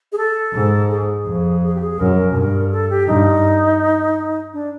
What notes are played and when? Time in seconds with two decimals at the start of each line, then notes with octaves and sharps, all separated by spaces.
0.12 G#4
0.18 A4
0.53 G#2
0.90 G#4
1.26 F2
1.63 G#4
1.75 G4
1.81 G#4
1.99 F#2 A#4
2.35 G2
2.72 A4
2.90 G4
3.08 G2 D#4
4.53 D4